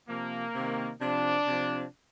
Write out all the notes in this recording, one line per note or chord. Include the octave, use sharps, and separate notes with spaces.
C3 F3 A#3
C3 D#3
C3 F3 D4
C3 F3